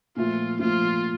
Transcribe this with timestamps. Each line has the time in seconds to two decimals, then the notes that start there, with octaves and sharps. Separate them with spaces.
0.16 A#2 F3 A3 F4
0.60 A#2 F3 A3 F4